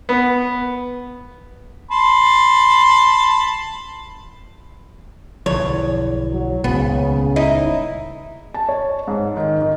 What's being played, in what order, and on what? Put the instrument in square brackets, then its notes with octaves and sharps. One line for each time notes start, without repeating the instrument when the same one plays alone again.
[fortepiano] B3
[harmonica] A5 B5 C6
[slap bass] B1 D3 F3 [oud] E2 [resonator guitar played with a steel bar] C#5
[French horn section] F#3
[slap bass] D#1 C#2 [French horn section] C#3 [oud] B3
[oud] D#4 [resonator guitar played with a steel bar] E4
[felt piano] A5
C#5
G#2
D#3
D#3